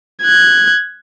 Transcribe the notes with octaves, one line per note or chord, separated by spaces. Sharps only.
F#6 G#6